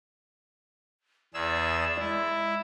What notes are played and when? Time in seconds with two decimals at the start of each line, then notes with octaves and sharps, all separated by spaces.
1.34 E2 G#4 D5 E6
2.00 G#3 E4